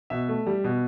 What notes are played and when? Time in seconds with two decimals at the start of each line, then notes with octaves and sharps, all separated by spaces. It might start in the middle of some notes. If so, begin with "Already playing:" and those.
0.10 B2 E5
0.29 A3
0.47 G3
0.64 B2